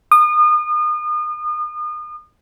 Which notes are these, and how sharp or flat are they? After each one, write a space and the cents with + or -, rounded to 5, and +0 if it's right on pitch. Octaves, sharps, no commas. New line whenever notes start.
D#6 -35